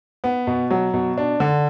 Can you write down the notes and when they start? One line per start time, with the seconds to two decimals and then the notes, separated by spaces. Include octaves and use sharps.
0.24 B3
0.47 B2
0.71 F#3
0.94 B2
1.18 D4
1.40 D3